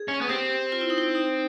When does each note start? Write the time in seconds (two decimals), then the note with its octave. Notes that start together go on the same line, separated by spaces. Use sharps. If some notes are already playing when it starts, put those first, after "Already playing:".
Already playing: G#4
0.08 C#4
0.21 B3
0.29 C4 G4
0.72 F4
0.81 E4
0.90 D#4
0.98 E4
1.15 D#4